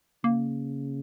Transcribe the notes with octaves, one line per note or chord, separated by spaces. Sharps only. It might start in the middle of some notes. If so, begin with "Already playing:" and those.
C#3 A#3